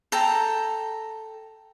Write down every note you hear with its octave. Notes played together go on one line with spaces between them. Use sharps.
A4 G5 A#5